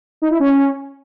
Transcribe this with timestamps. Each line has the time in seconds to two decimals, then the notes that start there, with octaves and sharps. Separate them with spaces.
0.22 D#4
0.31 E4
0.40 C#4